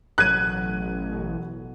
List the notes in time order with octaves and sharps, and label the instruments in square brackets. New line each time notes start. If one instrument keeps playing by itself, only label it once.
[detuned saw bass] A1 [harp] B2 F#3 A3 [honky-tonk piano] F#6 G#6 D#7
[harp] B2